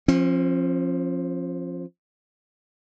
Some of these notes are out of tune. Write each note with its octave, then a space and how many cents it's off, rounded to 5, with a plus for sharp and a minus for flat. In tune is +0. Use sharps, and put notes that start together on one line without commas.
F3 +0 C#4 -45